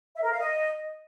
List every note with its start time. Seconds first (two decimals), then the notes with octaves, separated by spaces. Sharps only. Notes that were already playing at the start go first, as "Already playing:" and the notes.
0.15 E5
0.23 A#4
0.31 F5
0.39 D#5